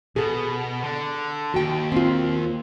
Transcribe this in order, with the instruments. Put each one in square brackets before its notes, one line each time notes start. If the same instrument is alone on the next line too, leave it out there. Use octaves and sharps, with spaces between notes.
[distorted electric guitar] B2 [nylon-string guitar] G#4 A4
[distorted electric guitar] D3
[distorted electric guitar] D#2 [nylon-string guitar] F#4 G5
[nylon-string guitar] C4 F4